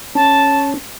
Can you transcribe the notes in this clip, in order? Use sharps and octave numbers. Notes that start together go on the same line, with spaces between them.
C#4 A5